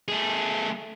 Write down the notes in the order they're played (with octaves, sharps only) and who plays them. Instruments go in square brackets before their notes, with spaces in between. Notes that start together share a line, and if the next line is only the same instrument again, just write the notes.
[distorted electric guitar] A3 G#4